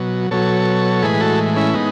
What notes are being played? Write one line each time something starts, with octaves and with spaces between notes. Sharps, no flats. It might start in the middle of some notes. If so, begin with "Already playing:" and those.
Already playing: B2 F#3
B2 F#3 A4 C#5
A2 E3 G#3 G#4 B4
F#4 A4
C#4 E4
G#3 B3 D#4